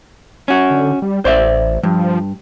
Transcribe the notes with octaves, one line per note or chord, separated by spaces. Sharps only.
C#4 F#4
D3
G3
A1 C5 D5 E5
G2 F3